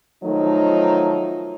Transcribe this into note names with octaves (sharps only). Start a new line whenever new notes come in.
D#3 F3 F#3 A3 D#4